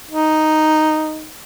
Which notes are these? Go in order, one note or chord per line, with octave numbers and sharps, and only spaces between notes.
D#4